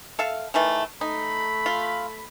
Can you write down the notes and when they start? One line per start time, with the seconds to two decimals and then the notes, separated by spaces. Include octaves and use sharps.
0.19 A4 E5 F5
0.54 D#3 E3 A3
1.01 A3 D#4 B5
1.66 F4